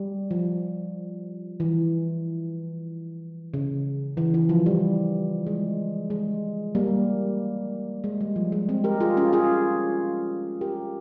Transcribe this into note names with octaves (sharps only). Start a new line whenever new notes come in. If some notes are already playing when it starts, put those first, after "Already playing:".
Already playing: G3
F3
E3
C#3
E3
E3
F3
G3
G#3
G#3
G3 A#3
G#3
G3
F3
G#3
G#3 C4
G4 A#4
F4 G#4
C#4 F4
F4 G#4
G4 A#4